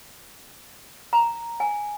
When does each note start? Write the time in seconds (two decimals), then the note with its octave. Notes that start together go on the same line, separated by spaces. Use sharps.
1.13 A#5
1.60 G#5